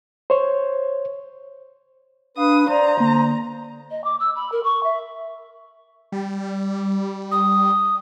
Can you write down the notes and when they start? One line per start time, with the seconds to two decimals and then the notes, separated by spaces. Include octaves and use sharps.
0.30 C5 C#5
2.37 D4 B4 F5 D#6
2.70 C5 D5 A#5
3.00 D3 A#3
3.91 D#5
4.04 D6
4.20 E6
4.35 B5
4.52 A#4
4.64 C#6
4.83 E5
6.12 G3
7.31 D#6